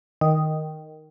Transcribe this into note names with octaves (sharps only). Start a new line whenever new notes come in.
D#3